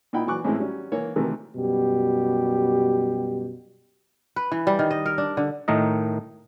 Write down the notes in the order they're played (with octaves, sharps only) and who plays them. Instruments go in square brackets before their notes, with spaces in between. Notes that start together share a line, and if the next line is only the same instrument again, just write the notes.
[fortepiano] A#2 D#4 E4 F#5 G5 B5
A#2 E3 F#3 C#6 D6 F#6
A2 E3 G#3 C4 C#4 E4
F#3 G3 C#4
E3 A#3 C#5
C3 D#3 E3 F#3 A3
[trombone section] F#2 B2 G3 G4
[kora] B4
E3
G3
D#3
D#5
A#4
D4
D3
[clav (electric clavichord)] A2 D#3 A3 A#4 D#5